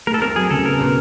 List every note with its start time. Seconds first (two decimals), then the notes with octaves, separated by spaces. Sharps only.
0.07 A3 A#4
0.14 A4
0.22 C4 A#4
0.36 F#3 G#4
0.50 C#3 A4
0.66 B3 A#4
0.80 B2